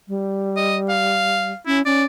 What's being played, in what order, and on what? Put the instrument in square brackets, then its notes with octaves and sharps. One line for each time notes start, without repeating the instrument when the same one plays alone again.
[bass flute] G3
[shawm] D#5
F5
[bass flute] C#4 [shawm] E4
[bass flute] C#4 [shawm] D5